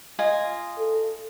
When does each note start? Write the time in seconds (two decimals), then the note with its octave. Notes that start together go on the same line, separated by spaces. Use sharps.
0.19 F4 D#5 G#5
0.78 A4